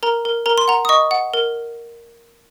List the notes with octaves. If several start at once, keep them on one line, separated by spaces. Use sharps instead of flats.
A#4 A#5
A#4
A#4 A#5
C6
F#5 A#5
D#6
D#5 C#6
F#5
A#4